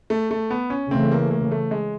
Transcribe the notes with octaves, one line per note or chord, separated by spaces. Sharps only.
A3
A3
B3
C#4
C#3 E3 A3 C4
A#3
A#3
A3
G#3